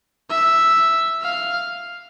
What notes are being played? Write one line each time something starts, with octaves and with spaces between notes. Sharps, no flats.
E5
F5